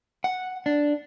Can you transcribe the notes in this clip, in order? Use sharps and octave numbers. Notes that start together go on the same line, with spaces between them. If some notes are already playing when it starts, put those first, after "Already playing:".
F#5
D4